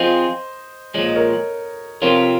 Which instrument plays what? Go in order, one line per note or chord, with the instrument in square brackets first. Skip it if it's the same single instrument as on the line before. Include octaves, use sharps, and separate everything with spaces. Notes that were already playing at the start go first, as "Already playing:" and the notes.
Already playing: [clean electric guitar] F3 C4 F4 G#4 [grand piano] C5 D#5
[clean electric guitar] A#2 F3 G#3 [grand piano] C#5
[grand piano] D#5
A#4 C#5
[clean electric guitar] F2 C3 F3 C4 F4 [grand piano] A#4 C#5